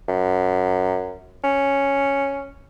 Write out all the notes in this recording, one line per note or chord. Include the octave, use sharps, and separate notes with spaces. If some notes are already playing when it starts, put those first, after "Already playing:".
F#2
C#4